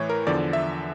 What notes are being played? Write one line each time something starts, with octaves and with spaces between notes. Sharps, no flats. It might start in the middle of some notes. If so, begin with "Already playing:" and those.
Already playing: A2 E3 C#5
A#4
E2 D3 F3 D5
E5